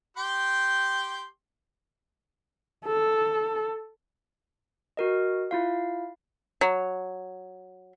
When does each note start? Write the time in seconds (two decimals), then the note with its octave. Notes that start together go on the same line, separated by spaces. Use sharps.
0.17 G4 G5 C6
2.85 A4
4.97 F#4 A#4 D#5
5.51 E4 F4 F5
6.61 F#3